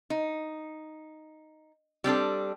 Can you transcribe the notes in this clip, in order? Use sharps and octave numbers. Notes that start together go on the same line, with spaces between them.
D#4
G3 C4 D4 A4